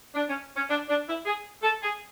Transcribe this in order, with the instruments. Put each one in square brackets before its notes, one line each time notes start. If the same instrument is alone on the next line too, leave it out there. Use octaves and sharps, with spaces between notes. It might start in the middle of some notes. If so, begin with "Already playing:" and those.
[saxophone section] D4
C#4
C#4
D4
D4
E4
G#4
A4
G#4